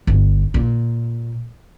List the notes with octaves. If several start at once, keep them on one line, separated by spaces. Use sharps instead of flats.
G1
A#2